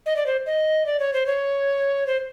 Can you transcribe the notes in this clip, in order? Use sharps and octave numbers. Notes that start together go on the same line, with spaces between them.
D#5
D5
C5
D#5
D5
C#5
C5
C#5
C5